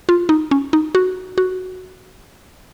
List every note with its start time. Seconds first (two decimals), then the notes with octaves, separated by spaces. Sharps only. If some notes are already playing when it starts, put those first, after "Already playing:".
0.09 F4
0.29 D#4
0.51 C#4
0.73 D#4
0.95 F#4
1.38 F#4